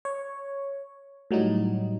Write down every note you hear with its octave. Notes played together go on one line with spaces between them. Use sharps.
C#5
A2 F#3 G3 D#4